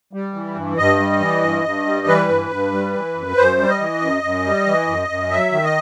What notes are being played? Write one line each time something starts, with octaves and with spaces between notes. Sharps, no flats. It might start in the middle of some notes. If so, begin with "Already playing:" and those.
G3
E3
G2
G2 D#5
G3
E3
G2
G2
G3
E3 B4
G2
G2
G3
E3
F#2
F#2 C5
G3
D#5
E3
F#2
F#2
G3
E3
F#2
F#2
F#3 E5
D#3
D#5